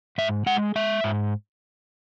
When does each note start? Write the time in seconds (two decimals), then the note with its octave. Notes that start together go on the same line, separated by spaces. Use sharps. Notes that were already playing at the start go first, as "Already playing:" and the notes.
0.18 G#2 E5
0.46 G#3 F#5
0.76 G#3 E5
1.04 G#2